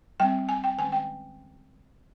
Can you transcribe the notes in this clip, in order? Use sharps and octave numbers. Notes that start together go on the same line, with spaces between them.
G3 C4 G5
G#5
G5
D#3 G#3 C#4 G#5
G5